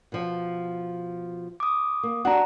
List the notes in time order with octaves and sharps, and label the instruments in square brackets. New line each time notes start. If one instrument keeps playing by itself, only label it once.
[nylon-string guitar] B2 F3
[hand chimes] D6 D#6
[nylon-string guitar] A#3
[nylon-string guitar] D4 F#4 [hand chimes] F#5 A#5